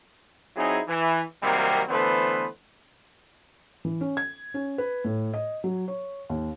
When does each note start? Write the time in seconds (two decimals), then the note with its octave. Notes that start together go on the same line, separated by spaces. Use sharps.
0.56 F#3 C4 D#4 E4 G#4
0.88 E3
1.43 C3 D#3 F#3 G3 A#3 C4
1.89 D3 E3 A3 B3 B4 C5
3.85 E3
4.01 C#4
4.17 G#6
4.54 C#4
4.78 B4
5.04 A2
5.34 D#5
5.64 F#3
5.88 C#5
6.29 D#2